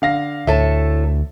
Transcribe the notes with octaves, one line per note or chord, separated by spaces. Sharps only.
D3 F5 A#6
D2 A2 A4 E5 A5